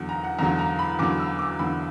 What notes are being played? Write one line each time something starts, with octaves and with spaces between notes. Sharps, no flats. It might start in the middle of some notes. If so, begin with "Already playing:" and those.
Already playing: E2 D3 F#3 F#5
A#5
F#5
E2 D3 F#3 A#5
A#5
B5
E2 D3 F#3 D6
E6
D6
E2 D3 F#3 B5